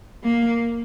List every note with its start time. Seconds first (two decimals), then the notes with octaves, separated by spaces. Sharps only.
0.23 A#3